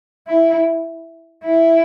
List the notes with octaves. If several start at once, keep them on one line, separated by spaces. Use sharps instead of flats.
E4
E4